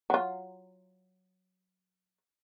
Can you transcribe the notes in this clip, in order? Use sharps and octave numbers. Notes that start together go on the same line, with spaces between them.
F#3 F4